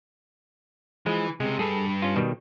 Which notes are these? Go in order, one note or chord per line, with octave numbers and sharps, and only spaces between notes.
E3 F3 G#3
C#2 C3 G#3
G2 G#4 A4 B4
C#4 F4
B2 D#3 G3